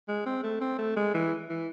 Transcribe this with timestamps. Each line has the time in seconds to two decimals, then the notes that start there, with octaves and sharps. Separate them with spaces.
0.08 G#3
0.26 C4
0.43 A3
0.61 C4
0.78 A3
0.96 G#3
1.14 E3
1.49 E3